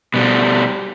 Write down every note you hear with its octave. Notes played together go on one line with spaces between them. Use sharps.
B2 G3